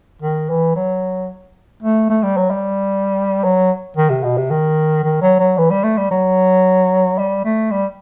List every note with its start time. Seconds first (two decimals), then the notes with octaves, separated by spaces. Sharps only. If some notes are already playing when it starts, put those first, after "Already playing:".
0.22 D#3
0.50 E3
0.76 F#3
1.83 A3
2.10 A3
2.23 G3
2.37 F#3
2.50 G3
3.44 F#3
3.97 D#3
4.10 C3
4.24 B2
4.37 C3
4.51 D#3
5.04 D#3
5.22 F#3
5.40 F#3
5.58 E3
5.71 G3
5.84 A3
5.97 G3
6.11 F#3
7.19 G3
7.45 A3
7.71 G3